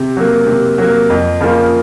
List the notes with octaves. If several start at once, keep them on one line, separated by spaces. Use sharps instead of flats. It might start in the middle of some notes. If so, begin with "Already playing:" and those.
Already playing: C3
F#3 A#3
C3
F#3 A#3
F2
C#3 F3 A#3 F4